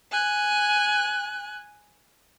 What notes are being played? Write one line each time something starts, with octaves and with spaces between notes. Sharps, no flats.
G#5 F#6